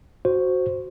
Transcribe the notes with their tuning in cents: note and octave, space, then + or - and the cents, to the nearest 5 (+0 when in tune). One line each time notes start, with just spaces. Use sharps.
F#4 +0 C5 +0